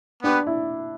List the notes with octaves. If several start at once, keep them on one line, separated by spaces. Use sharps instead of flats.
B3 D4 G4 B4
E4